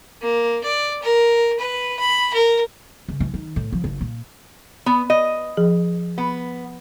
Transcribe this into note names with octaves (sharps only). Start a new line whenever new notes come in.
A#3
D5
A#4
B4
B5
A#4
C#2
E3
D#3
A2
F3
F#1
A#2
B3
D#5
F3 G#4
B3